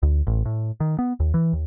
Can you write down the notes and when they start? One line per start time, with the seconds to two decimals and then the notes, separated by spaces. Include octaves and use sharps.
0.03 D2
0.27 A1
0.45 A2
0.80 D#3
0.99 B3
1.20 D#2
1.34 E3
1.53 D#2